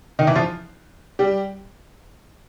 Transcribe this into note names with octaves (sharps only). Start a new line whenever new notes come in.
D#3 D#4
E3 E4
F3 F4
G3 G4